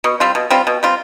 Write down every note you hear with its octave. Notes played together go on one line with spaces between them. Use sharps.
B2
G3 C4 F4
B2
G3 C4 F4
B2
G3 C4 F4